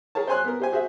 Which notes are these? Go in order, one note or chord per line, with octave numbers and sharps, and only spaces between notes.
G#4 A#4 C#5 A5
C5 C#5 G#5 C6 F#6
B3 A#4
G4 C5 G#5
F#4 G#4 C5 E5